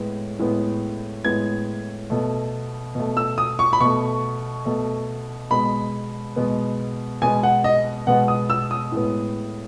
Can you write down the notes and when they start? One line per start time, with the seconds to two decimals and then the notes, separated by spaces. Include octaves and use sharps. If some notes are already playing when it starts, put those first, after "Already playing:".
Already playing: A2 G#3 B3
0.39 A2 G#3 B3
1.25 A2 G#3 B3 G#6
2.10 B2 A3
2.95 B2 A3
3.17 E6
3.38 D#6
3.59 C#6
3.73 B5
3.80 B2 A3 C#6
4.65 B2 A3
5.51 B2 G#3 B3 B5
6.36 B2 G#3 B3
7.22 B2 G#3 B3 G#5
7.43 F#5
7.64 D#5
8.07 B2 G#3 B3 F#5
8.28 D#6
8.50 E6
8.71 D#6
8.92 A2 G#3 B3